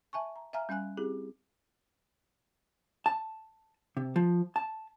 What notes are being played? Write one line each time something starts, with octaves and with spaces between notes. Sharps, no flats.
E5 G#5 A5 C#6
A#5
E5 F5 G#5 A#5 F6
G3 C#4 F5 G#5 F#6
C4 E4 G4 G#4
A5
C3
F3
A5